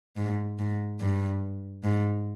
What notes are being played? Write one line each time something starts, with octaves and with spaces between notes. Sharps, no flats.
G#2
G#2
G2
G#2